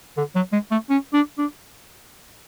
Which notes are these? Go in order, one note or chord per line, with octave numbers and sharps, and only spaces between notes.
D3
F#3
G#3
A3
C#4
D4
D4